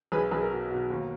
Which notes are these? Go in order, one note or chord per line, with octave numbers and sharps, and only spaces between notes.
B1 G#4 B4
B1 G#4 B4
A#4
B2
B2
D#2